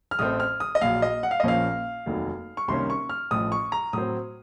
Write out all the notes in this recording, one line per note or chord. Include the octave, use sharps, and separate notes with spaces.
F6
A1 A2 A3 C4 D#6
F6
D#6
D#5
A#1 A#2 F#3 F5
D#5
F#5
F5
D#5
A#1 A#2 F3 A#3 C#4 F5
F1 D#2 D#3 F#3
C#6
C2 C3 D#3 A#3 C#4 C6
C#6
F6
A1 A2 F3 D#6
C#6
A#5
A2 F#3 C4 D#6